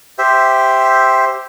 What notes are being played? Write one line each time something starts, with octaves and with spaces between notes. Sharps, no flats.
G4 C5 E5